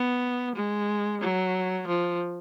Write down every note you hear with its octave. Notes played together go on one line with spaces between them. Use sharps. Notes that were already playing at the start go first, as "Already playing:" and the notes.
Already playing: B3
G#3
F#3
F3